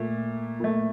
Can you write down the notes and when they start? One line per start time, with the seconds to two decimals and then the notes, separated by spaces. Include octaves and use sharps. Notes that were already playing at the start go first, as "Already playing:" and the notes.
Already playing: A#2 A3
0.60 A#2 A3